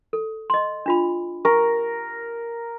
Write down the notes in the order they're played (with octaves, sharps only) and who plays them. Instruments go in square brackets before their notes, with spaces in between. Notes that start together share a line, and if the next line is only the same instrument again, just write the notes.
[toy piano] A4
D#5 C6
D4 F4 B5
[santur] A#4 [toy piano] C#6